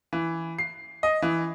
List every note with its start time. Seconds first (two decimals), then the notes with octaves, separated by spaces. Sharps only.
0.13 E3
0.59 C7
1.03 D#5
1.22 E3